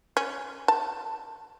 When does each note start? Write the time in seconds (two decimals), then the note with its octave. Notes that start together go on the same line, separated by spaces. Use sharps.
0.17 C#4
0.68 A5